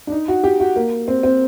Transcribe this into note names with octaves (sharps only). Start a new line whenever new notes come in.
D4
D#4
F#4
G4
F#4
A#3
C4
C4